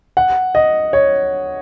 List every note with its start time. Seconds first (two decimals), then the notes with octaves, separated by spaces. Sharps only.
0.17 F#5
0.55 D#5
0.93 C#5